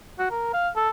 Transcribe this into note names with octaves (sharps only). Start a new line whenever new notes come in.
F#4
A#4
F5
A4